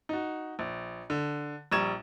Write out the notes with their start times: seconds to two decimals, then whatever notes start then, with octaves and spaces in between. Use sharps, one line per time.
0.09 D#4 F#4
0.59 A#1
1.10 D3
1.72 A#1 G3 A#5 C#6 G#6 E7